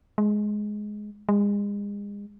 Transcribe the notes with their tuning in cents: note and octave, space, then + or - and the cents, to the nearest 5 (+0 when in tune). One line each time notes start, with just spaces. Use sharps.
G#3 +10
G#3 -35